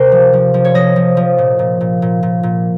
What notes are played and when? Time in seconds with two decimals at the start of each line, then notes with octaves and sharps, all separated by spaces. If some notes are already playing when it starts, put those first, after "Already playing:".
Already playing: C3 A#4 C5
0.12 F3
0.33 F3
0.54 F3
0.65 C#5
0.75 F3 D#5
0.96 F3
1.17 F3
1.38 A#2
1.59 A#2
1.81 A#2
2.02 A#2
2.23 A#2
2.43 A#2